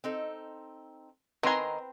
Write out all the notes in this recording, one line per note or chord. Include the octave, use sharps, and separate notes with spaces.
C4 D#4 A4
D#3 C4 B4 G#5 A#5 C6